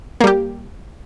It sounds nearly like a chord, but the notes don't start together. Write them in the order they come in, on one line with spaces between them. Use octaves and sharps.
A#3 G3 G4